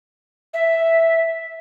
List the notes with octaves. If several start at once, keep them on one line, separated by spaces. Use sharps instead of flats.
E5